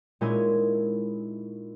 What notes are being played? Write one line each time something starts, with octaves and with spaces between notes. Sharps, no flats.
A#2 G#3 C#4 D#4 E4 G#6